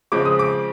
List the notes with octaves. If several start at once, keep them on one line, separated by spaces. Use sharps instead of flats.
C#3 F3 G#3 C4 D6
D#6
D6